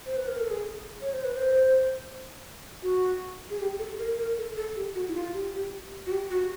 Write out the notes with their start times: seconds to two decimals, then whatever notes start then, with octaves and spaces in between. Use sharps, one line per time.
0.06 C5
0.17 B4
0.28 A#4
0.40 A4
0.50 G#4
1.01 C#5
1.13 C5
1.24 B4
1.35 C5
2.83 F#4
3.50 G#4
3.60 G4
3.79 A4
3.99 A#4
4.18 A#4
4.38 A4
4.57 A4
4.76 G4
4.95 F#4
5.08 E4
5.15 F4
5.34 G4
5.54 G4
6.07 F#4
6.12 G4
6.31 F#4